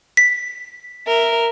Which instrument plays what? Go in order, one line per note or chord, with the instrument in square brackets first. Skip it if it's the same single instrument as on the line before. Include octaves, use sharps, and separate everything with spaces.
[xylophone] B6
[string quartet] A#4 E5